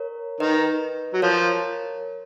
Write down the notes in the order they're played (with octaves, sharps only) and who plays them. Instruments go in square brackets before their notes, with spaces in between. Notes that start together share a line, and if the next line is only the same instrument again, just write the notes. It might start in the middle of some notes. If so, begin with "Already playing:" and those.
Already playing: [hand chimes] A#4 C#5
[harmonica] D#3 [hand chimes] B4 D#5
[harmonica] F#3
[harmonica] F3 [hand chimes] A#4 C#5